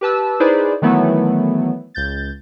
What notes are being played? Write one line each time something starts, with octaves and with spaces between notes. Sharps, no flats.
G4 B4 A5 E6
D#4 E4 G#4 B4 C5 D5
D#3 E3 F#3 A3 B3 E4
C#2 G6 A6